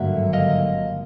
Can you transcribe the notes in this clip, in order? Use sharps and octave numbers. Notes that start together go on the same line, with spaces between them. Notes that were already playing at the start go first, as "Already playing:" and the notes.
Already playing: G#1 G2 D3 F#3 A#3 E5 F#5
D#5 F5